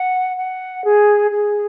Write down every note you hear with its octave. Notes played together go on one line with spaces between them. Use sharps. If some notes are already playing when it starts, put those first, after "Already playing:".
Already playing: F#5
F#5
G#4
G#4